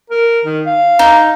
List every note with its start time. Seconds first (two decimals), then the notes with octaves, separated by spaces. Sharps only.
0.10 A#4
0.45 D#3
0.66 F5
0.99 D#4